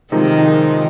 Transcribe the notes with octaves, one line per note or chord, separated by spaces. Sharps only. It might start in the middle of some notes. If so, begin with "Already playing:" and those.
C3 D#3 F3 G#3 D#4 A#4